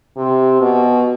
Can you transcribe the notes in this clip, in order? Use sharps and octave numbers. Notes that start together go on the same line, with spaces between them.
C3
B2